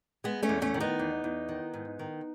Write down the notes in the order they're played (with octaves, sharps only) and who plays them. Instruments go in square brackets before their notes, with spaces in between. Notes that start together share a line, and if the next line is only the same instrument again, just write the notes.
[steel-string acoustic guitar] G#3 B3
A3 C#4
E2
A3 C#4
D#3
B3 D#4
E2
E2
D#3
G#2
D#3